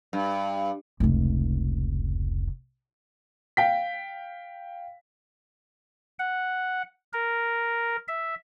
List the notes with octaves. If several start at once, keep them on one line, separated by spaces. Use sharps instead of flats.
G2
F1 C#2
F5 G5 B6
F#5
A#4
E5